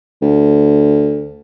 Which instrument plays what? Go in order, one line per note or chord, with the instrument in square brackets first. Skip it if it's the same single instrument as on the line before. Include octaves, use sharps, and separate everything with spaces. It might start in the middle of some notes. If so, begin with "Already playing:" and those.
[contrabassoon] D2